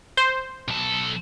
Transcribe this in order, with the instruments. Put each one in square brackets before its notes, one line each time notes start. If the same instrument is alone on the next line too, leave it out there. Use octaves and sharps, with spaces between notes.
[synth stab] C5
[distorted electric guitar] B1 A4